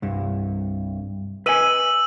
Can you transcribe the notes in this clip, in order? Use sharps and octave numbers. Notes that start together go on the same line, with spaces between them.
C2 G2
B4 D#5 G#5 E6 D#7 F#7